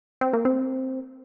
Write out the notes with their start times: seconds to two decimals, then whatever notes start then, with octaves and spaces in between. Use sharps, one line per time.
0.21 C4
0.33 A#3
0.45 C4